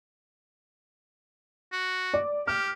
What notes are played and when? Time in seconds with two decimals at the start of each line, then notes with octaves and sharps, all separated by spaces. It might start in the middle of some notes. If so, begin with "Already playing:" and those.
1.72 F#4
2.14 D5
2.47 G4 F6